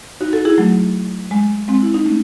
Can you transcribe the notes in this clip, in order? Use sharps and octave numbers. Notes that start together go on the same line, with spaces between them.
D#4 F#4
F#4 A4
E4 G#4
F#3 A3
G#3
G#3 C4
E4
D#4
A3 C#4